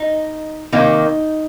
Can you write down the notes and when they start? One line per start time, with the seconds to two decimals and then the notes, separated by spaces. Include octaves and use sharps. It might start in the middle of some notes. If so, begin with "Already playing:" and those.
Already playing: D#4
0.72 C3 D#3 A#3 D#4